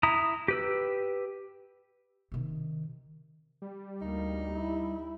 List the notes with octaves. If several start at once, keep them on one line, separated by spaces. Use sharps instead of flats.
E4 A#5 D#6
G4 B4 E6
C3 D#3
G3
D2 A#3 D#4
E4